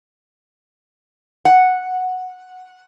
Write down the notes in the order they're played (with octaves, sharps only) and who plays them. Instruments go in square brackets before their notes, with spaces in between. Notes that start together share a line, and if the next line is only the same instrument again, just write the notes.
[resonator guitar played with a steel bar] F#5